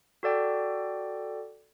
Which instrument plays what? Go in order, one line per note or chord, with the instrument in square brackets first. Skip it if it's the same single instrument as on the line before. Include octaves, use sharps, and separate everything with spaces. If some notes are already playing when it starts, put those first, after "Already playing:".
[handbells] F#4 A4 D5 G5